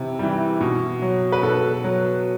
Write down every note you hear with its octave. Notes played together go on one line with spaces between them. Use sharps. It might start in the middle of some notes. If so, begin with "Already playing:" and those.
Already playing: C3 E3
E3 G3
B2
F#3
B4
B2 A4
F#3